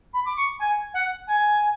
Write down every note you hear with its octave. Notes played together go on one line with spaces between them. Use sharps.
B5
D6
C#6
G#5
F#5
G#5